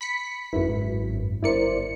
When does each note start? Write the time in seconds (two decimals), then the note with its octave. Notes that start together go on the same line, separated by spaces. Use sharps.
0.01 B5 B6 C#7
0.53 G#1 F#2 E4 B4
0.69 G#2
1.43 G1 E4 A#4 C5 D5 C#7